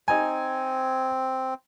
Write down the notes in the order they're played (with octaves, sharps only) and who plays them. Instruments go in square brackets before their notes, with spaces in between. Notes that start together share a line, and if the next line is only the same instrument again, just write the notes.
[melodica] C4 [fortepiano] D#4 G#5